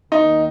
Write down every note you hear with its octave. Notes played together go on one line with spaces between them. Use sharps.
D#2 D#3 A#3 D#4